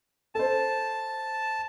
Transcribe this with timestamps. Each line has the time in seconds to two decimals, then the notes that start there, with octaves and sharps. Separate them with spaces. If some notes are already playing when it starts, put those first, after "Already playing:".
0.35 A4 C5 A5